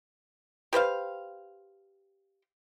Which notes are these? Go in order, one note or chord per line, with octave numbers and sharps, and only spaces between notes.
G4 B4 C5 F5